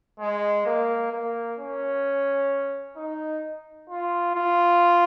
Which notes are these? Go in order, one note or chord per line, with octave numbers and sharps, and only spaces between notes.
G#3
A#3
A#3
C#4
D#4
F4
F4